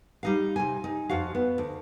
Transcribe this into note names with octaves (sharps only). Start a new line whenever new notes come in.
G3 D#4 F5
C3 G#5
D#4
F2 F#4 F5
B3
D2